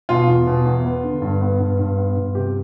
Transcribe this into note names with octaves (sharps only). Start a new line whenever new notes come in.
B2 F4
E2
B2
E2
B3
D3
G2
B3
G2
G2
B3
G2
C3 G4